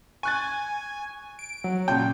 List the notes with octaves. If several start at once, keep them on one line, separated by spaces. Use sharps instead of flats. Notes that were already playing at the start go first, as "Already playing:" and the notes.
G#5 C#6 F#6 A6
D7
F#3
A#2 C#3 G5